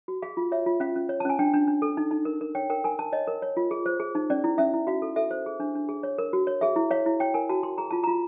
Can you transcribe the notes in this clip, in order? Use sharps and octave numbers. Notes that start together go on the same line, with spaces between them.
F#4
G#4 F5
F4
C#5 E5
F4
C#4 F5
C#4
C#5
A5
C#4 G#5
D4 G5
D4
D4
A4
D#4
D#4
A#4
A#4
C#5 G5
A#4 G5
A#4 G#5
A#4 A5
C#5 D#5
A#4
C#5
F4
G#4
C5
G#4
D#4
C#4 D5
E4
C#4 E5
E4
F#4 F5
A4
A4 E5
C5
G#4
D4
D4
G#4
C#5
A#4
F#4
C#5
G#4 E5
E4
C#5 F5
E4
C#5 G5
A#4 G#5
F#4 A5
F#4 C6
G#4 A#5
F4 A5
F4 A#5